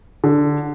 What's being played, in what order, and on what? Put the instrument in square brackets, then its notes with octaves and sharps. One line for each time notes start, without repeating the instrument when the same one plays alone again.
[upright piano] D3